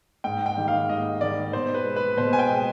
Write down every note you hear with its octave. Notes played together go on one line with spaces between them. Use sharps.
G#2 G5
G5
D#3 G3
F5
G#2 D#5
D#3 G3 D5
B2 C5
B4
G#3
B4
B2 C5
G#5
G5
G#3